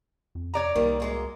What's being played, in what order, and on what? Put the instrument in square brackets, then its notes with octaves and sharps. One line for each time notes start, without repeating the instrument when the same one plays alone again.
[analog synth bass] F2
[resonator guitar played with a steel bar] C#5 D5 A#5
[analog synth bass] C2 [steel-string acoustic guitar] D#3 G3 A#3
[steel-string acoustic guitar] F#2 G#3 A#3